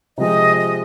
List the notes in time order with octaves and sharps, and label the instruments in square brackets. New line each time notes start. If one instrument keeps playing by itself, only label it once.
[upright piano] C3 F3 G#3 [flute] D#5
[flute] D#5